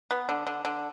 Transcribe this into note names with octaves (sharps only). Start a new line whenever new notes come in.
B3
D3
D3
D3